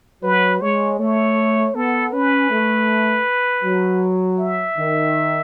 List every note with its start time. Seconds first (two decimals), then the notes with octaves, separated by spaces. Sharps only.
0.23 F#3 B4
0.61 G#3 C#5
0.99 A3 C#5
1.75 B3 A4
2.13 C#4 B4
2.50 A3
3.64 F#3
4.39 E5
4.77 D#3